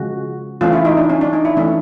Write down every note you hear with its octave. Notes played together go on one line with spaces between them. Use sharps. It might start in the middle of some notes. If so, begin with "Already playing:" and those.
Already playing: C#3 F3 G#3 F#4
E3 A3 C#4 F4
E4
D#4
D4
C#4
D4
D#4
E4
E3 A3 C#4 D4